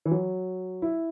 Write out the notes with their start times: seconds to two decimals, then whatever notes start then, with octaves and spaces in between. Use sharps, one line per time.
0.05 E3
0.11 F#3
0.82 E4